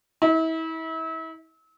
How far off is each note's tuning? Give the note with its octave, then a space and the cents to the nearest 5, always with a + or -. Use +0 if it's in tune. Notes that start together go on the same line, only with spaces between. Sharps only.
E4 -35